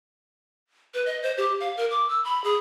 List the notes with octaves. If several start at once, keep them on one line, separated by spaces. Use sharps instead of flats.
B4
D#5
C5
G4
F5
A#4
D6
E6
B5
G#4